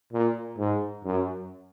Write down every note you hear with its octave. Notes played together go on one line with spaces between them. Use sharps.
A#2
G#2
F#2